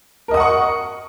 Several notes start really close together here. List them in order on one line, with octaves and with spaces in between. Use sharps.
A#4 D#5 D#6 F#5 C#6